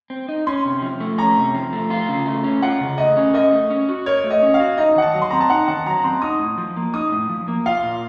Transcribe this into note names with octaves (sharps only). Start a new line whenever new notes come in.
C4
D#4
C#4 C6
C3
F3
A3
C#4 A#5
C3
F3
A3
F4
C#3
A3
C#4
F4 F#5
C#3
A3 D#5
C#4
A#4 D#5
A3
C#4
F#4
A#4 C#5
A3
D#5
C#4
F5
F#4
D#4 D#5
D#3 F#5
A5
F#3
C6
C4 A#5
A5
D#4 F#5
D#3 F#5
F#3 A#5
C4 C6
D#4 D#6
A2
F3
A#3
D#4 D#6
A2
F3
A#3
F4 F5
A#2